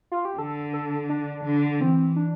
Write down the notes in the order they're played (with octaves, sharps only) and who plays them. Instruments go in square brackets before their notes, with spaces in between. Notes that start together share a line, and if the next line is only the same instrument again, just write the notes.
[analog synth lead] F4
G4
[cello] D3 [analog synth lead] A4
[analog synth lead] A4
D4
[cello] D3
[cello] E3 [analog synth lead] C4
[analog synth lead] D4